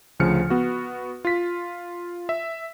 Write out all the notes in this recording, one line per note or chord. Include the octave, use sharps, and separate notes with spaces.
D2 C#3 F3 F6 C#7
B3 F#4
F4 B6
E5